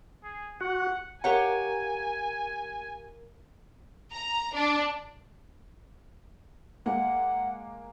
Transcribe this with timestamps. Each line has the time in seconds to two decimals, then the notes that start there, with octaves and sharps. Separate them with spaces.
0.24 G#4
0.61 F#4 F#5
1.24 G4 A#4 C#5 F5 F#5 G#5 A#5
4.12 A#5
4.54 D4
6.86 G#3 A#3 F#5